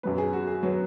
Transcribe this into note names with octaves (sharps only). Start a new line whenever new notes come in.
F#2 F#3 B3 B4
G#4
F#4
G#4
F#3 B3